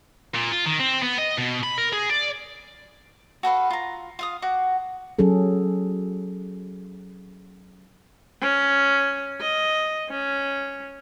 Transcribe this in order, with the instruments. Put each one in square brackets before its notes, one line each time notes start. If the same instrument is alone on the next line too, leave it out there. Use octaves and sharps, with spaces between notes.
[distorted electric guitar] A#2
F4
D#3
C4
B3
D#5
B2
B5
A#4
G#4
D5
[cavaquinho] F#4 A4 B4 F5
F4 A#5
F4 F5 D#6
F#4 F#5 D6
[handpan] F#3 C#4 G#4 A4
[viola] C#4
D#5
C#4